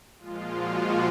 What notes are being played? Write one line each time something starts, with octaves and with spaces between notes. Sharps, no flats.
A#2 F3 G#3 F4
F#4